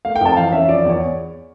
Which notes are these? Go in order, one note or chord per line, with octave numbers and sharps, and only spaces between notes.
A3 F5
G5
F2 A5
E3 F5
C#4 E5
F3 D5
D5
E2 C#5